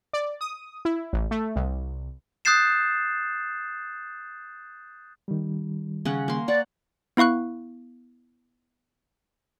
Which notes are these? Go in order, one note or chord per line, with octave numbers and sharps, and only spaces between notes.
D5
D#6
E4
A1
A3
C2
D#6 F#6 G6 A6 C7 E7
D#3 G3
C#3 C#4 F#5
A#3 C6
C#5 D5 F#5
B3 E4 F5 C#6 F#6